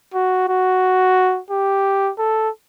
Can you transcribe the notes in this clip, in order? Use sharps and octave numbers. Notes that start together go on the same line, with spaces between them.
F#4
F#4
G4
A4